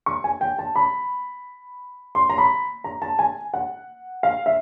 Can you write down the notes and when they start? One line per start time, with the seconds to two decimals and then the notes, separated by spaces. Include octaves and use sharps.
0.06 C#6
0.24 G#5
0.41 G5
0.59 A5
0.76 B5
2.15 C6
2.30 A#5
2.38 B5
2.84 A#5
3.02 A5
3.19 G#5
3.54 F#5
4.23 F5
4.46 E5